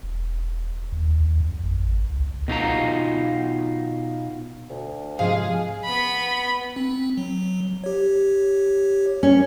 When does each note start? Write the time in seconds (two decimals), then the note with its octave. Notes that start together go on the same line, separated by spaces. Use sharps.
0.03 E1
0.92 D#2
1.20 D#2
1.40 F2
1.64 A1
1.88 G#1
2.10 C#2
2.48 B2 D#4 F4 A#5
4.70 D2
5.19 G#2 C3 F3 G#3 G#4 F5
5.85 B3 B5
6.76 C4
7.17 F#3
7.84 G4 C#5
9.23 C#4